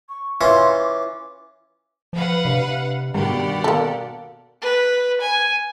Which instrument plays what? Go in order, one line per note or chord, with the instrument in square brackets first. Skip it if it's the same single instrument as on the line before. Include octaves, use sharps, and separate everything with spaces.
[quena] C#6
[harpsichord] E3 C#4 F4 [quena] C6
[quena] D6
[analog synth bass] F3 [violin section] B4 F5 F#5
[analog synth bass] C3 [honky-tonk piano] D4
[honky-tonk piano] G2 B2 [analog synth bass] D#3 [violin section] G4 D5 F#5
[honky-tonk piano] B2 [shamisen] A#3 A4
[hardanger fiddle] B4
G#5